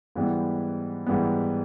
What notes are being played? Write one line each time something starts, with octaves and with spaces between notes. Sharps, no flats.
G#2 E3 G3 B3
G#2 E3 G3 B3